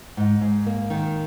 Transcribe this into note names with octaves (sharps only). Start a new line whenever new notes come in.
G#2
G#2
A#3
D#3